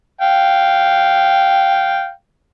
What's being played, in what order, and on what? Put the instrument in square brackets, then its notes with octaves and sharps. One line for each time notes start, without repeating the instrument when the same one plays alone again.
[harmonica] F5 G5